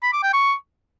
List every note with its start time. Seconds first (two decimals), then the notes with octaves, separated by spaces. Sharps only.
0.03 B5
0.13 D6
0.23 G5
0.33 C#6